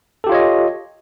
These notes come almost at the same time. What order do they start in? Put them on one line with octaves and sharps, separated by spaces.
A4 G4 F4 C#5 D#5